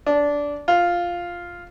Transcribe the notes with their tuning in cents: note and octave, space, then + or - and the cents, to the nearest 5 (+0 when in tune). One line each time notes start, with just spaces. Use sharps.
D4 -15
F4 +0